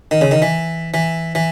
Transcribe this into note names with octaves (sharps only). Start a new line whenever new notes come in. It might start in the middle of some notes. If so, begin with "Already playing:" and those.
D#3
C#3
D#3
E3
E3
E3